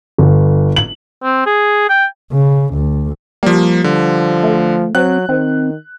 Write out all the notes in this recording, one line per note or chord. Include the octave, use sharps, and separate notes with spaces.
G1
F#7
C4
G#4
G5
C#3
D2
F3 G3 A#3
D3 F3
A3
F#3 C4 F#6
D#3 C4